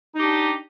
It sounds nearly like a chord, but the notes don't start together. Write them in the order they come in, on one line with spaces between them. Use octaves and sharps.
D#4 G4 D4